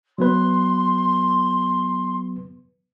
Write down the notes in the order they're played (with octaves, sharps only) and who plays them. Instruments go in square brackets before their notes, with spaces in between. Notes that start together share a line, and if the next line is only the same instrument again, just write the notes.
[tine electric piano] F#3 B3 B4 [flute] C6